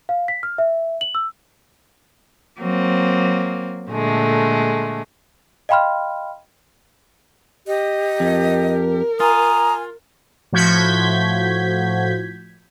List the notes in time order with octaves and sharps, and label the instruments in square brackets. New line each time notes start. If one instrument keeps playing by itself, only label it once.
[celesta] F5
B6
F6
E5
F#7
E6
[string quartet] F#3 A#3 C4
A#2 D3 G#3 A3
[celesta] D#5 F5 G5 B5 C6 F6
[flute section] G4 [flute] D#5
[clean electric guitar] F2 [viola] A#4
[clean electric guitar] F4 [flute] G#5 [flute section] A#5 D#6
[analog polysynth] A2 F3 F#4 G6 G#6 B6